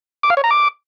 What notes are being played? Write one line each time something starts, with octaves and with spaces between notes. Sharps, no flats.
D6
F5
C#5
A#5
D6